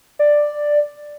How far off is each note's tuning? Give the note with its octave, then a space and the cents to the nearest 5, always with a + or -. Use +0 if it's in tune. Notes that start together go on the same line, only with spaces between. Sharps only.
D5 +5